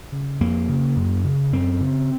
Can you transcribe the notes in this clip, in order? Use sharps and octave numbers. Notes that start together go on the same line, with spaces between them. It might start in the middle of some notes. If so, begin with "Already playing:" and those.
C#3
F2 A#3
C#3
F#2
C#3
F#2 C4
C#3